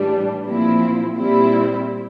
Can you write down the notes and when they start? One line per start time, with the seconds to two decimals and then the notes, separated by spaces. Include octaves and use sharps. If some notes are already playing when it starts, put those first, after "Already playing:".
Already playing: A2 E3 G3 D4
0.46 A#2 F3 C4 E4
1.17 A#2 G3 C4 E4